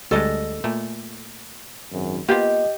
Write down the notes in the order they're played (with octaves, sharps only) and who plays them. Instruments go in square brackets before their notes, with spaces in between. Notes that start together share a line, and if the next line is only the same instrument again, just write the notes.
[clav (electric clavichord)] D2 G3 G#3 [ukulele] A4 D#5
[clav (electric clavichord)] A#2 A3
[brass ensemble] G#1 F#2
[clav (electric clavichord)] A#3 B3 F4 [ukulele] G4 [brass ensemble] D#5